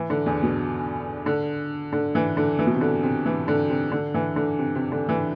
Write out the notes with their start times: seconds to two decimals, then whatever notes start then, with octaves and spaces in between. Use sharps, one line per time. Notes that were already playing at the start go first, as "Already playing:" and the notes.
Already playing: E3
0.10 D3
0.26 E2
0.43 B2
1.26 D3
1.93 D3
2.15 E3
2.37 D3
2.59 E3
2.67 B2
2.74 C3
2.81 D3
3.03 C3
3.26 E3
3.48 D3
3.70 C3
3.92 D3
4.14 E3
4.36 D3
4.58 C3
4.75 C3
4.92 D3
5.09 E3